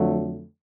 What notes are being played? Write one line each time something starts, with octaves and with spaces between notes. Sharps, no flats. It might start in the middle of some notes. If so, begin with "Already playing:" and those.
Already playing: F2 D3 F#3 A3